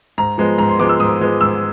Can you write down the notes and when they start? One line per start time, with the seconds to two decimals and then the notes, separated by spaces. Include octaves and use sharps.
0.18 G#2 A#5
0.38 F3 G#3 B3
0.58 G#2 A#5
0.69 C6
0.79 F3 G#3 B3 D6
0.89 E6
1.00 G#2 D#6
1.21 F3 G#3 B3
1.41 G#2 E6